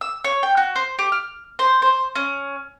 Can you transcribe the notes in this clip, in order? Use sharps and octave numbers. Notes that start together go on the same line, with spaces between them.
E6
C#5
G5
F#4
C5
G4
F6
C5
C5
C#4